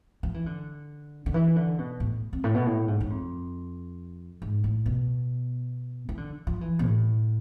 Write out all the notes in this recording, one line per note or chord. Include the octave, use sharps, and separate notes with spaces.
F3
E3
D3
D3
E3
D3
B2
A2
F2
A2
B2
A2
G#2
G#2
F2
G#2
A2
B2
E3
D3
F3
E3
B2
A2